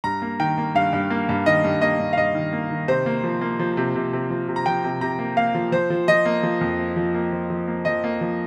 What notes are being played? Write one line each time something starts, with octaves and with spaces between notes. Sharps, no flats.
G2 A#5
A#3
D#3 G5
A#3
G2 F5
G2
A#3
G2
D#3 D#5
G2
A#3 D#5
G2
F5
G2 D#5
D#3
A#3
D#3
C3 C5
A#3
F3
A#3
F3
C3
C3
C3
F3
C3
A#5
F3 G5
C3
C3 A#5
A#3
A#3 F5
F3
F3 C5
F3
F3 D#5
A#3
F3
F2
F3
F3
A#3
F3
F3
A#3
F3 D#5
A#3
F3